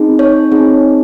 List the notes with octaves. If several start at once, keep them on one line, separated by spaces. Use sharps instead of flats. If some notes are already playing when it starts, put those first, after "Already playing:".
Already playing: C4 D#4 G#4
C#5
C4 D#4 G#4